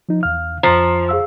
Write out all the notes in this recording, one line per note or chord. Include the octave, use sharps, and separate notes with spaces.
F3 D#4
E2 F5 F6
F2 F3 C5 A#5
G#4 F5 E6